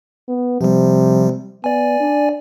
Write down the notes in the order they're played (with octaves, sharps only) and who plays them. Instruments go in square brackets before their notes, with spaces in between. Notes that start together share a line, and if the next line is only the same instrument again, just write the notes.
[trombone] B3
[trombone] C3 [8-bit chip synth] F3 G3
[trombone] B3 [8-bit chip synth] D5 G#5
[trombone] D4